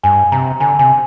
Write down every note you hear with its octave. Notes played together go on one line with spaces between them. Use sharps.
G2 G#5
C3 A#5
D3 G#5
C3 G#5